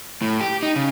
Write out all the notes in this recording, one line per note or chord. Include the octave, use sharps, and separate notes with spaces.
A2
G4
D#4
C#3